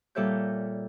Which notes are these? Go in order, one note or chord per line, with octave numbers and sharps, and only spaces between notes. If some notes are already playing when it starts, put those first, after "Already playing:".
A#2 G3 A4 C#5 E5 G6